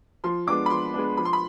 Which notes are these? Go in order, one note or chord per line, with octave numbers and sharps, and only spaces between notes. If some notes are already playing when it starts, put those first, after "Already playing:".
F3 C6
G#3 B3 D4 D6
B5
F3 C6
G#3 B3 D4
F3 B5
C6
B5